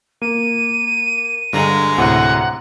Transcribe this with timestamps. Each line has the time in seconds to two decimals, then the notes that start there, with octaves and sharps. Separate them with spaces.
0.22 A#3 D#7
1.53 G2 D3 G#3 A#5
1.98 D2 A2 C3 F#5